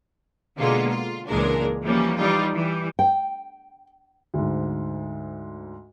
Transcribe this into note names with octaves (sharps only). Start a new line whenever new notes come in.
B2 D3 G#3 A#3 F4
F4
C#2 A#2 E3 G#3 D4 A#4
E3 F3 G3 A#3 C#4
E3 G3 D#4 F4
E3 G3
G5
D2 G#2